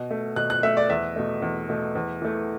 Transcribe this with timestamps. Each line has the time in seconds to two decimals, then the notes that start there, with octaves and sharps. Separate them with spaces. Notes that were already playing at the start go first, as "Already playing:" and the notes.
Already playing: B2
0.11 A3
0.36 B2 F#6
0.50 F#6
0.63 A3 E5
0.77 D5
0.89 E2 E5
1.16 B2 A3
1.42 E2
1.69 B2 A3
1.95 E2
2.22 E3 A3